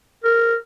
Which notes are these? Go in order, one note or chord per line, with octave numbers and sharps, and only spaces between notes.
A#4